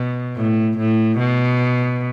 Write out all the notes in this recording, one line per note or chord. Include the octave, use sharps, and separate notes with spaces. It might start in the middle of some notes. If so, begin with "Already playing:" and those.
Already playing: B2
A2
A2
B2